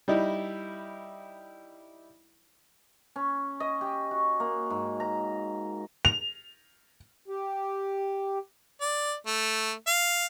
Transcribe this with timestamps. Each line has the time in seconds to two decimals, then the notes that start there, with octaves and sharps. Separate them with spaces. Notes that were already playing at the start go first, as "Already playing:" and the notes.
0.08 G3 D#4 E4
3.16 C#4
3.60 D#5
3.81 G4
4.11 F#4
4.40 A#3
4.70 G#2
5.00 A#5
6.05 F7
7.28 G4
8.81 D5
9.26 A3
9.87 F5